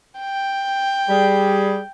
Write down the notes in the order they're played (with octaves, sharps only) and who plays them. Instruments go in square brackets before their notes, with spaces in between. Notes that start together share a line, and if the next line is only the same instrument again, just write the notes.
[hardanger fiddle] G5
[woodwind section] G3 G#4